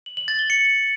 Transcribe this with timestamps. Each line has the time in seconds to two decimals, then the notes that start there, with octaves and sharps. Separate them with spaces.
0.06 F#7
0.17 F#7
0.28 A6
0.39 G7
0.50 C#7